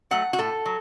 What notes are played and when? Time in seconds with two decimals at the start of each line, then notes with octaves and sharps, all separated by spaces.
0.11 F#3 A3 F#5
0.33 F#4
0.38 A2 A4
0.66 F#3